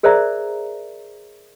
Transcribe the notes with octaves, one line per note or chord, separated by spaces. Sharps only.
G#4 A#4 C5 D5 E5 A#5